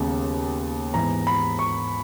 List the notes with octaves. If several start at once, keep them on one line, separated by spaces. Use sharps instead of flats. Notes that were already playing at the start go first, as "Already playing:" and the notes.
Already playing: D#2 C#3 G#3 B3
G#2 E3 B3 A#5
B5
C#6